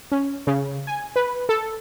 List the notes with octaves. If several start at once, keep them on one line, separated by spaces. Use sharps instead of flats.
C#4
C#3
G#5
B4
A4